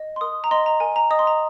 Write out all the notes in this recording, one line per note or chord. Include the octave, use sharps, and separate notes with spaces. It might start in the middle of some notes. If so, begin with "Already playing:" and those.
Already playing: D#5
C6
A#4 D#6
A#5
D#5 C6
A#5
A#4 G#5
A#5
D#5 D#6
C6
A#5